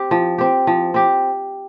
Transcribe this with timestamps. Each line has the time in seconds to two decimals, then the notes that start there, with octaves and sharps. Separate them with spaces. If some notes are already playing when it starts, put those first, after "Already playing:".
Already playing: C4 G4
0.11 F3
0.38 C4 G4
0.67 F3
0.94 C4 G4